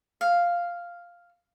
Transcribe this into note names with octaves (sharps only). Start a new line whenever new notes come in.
F5